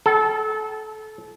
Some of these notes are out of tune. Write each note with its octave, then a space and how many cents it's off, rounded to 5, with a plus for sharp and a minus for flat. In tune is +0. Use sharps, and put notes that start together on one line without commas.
A4 -25 G5 -35